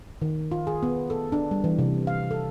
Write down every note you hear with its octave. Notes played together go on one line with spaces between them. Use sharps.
D#3
F4
G#4
B3
A4
D4
G3
E3
C3
F5
A4